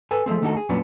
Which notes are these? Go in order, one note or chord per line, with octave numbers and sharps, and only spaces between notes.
A4 B4 G#5
F3 G#3 A3 C4
D#3 A3 D4 D#4 F#4 A4
G#4
F2 A#2 F#3 B3 C#4 D4